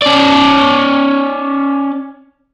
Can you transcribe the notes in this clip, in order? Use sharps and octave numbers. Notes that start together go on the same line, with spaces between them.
C#4 D5